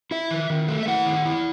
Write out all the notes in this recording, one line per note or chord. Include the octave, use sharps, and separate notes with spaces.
E4 E5
D#3
D#3
A3
E5
E4 F#5
D#3
E4